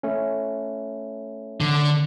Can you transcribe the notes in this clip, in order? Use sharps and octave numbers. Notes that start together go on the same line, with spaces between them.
A3 C#4
D3